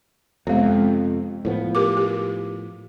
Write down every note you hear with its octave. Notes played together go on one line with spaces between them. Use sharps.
F2 C3 G#3 B3
A2 F3 B3
G4 A#4 D6
G4